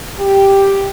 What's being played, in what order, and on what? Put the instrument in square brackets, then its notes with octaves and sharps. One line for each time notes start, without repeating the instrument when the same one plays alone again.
[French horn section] G4